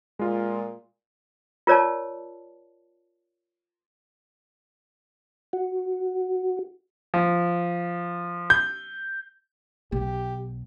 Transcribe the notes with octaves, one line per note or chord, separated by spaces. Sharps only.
A#2 G#3 F4
F4 A#4 C#5 D5 A5
F#4
F3
G6
B1 G4